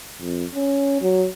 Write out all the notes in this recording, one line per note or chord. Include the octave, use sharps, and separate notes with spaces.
F2
C#4
F#3